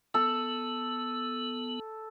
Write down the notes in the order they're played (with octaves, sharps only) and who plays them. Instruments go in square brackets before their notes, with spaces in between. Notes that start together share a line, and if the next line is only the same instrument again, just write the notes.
[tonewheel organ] B3 [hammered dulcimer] A4